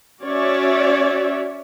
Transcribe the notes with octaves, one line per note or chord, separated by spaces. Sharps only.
C#4 F#4 C#5 D5 E5